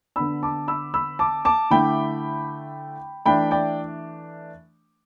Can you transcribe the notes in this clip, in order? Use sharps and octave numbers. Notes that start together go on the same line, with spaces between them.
D3 B3 D4 B5 E6
A5 D6
B5 E6
B5 E6
A5 D6
A5 D6
D3 A3 E4 G5 B5
E3 A3 D4 G5 B5
D5 G5